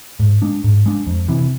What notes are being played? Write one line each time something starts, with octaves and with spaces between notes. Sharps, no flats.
G#2
G#3 D4
G#2
G#3 D4
F2
C3 E3